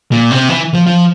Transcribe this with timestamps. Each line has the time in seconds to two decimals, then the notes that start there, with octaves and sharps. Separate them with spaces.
0.12 A#2
0.31 C3
0.49 E3
0.73 F3
0.86 F3